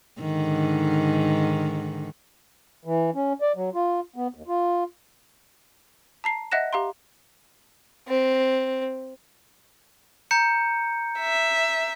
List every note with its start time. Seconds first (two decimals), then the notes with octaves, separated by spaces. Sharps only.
0.20 G#2 D3 D#3
2.85 E3
3.15 C#4
3.41 D5
3.56 F#3
3.75 F4
4.16 B3
4.34 D#2
4.48 F4
6.24 A5 A#5 C7
6.52 D#5 E5 F#5 F#6 A#6 E7
6.73 G4 F5 A#5 C6
8.08 C4
10.31 A#5 G6 C#7
11.20 E5